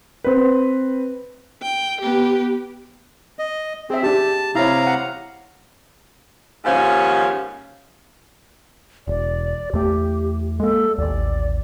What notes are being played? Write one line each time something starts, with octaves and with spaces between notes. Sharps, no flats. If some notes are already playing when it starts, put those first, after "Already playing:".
C4 B4
G5
B3 G4
D#5
C4 G#4 E5
D4 G4 A5
C3 E4 C#5 F5 A#5
F#5
D#2 G#2 F3 C#4
E1 D5
E2 A3 G4
G#3 A#3 A4
A1 D#2 D5